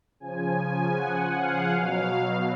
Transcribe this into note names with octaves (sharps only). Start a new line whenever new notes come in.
C#3 F3 G#5
F#5
F5
B2 F#3